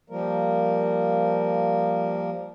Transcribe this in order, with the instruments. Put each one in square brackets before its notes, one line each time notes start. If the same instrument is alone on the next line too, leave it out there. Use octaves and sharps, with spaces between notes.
[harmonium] F3 G3 A#3 A#4